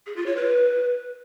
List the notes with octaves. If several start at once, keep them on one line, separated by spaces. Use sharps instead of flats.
G#4
F4
C#5
B4